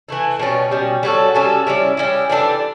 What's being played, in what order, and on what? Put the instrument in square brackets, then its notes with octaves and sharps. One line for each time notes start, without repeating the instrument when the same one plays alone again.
[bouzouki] E3 A3 E4
B2 G3 C#4
B2 G3 C#4
G3 C#4 F#4 A4
G3 C#4 F#4 A4
G3 C#4 E4
G3 C#4 E4
E3 G3 D4 A4